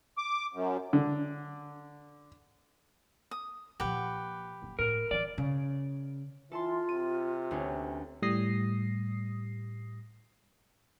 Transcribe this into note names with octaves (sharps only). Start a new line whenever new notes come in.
D6
F#2
D3
D#6
A#2 F3 G4 B4 F#5
F#1
A2 A#4
E3 G3 D5
C#3
E3 F4 A4 A5 C6
C3 D#7
D2 B3 C#4
A2 G3 D#6 A#6 C7